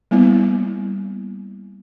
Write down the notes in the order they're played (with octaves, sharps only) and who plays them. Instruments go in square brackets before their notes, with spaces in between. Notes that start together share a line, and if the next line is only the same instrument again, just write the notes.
[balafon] G3 A#3 B3 E4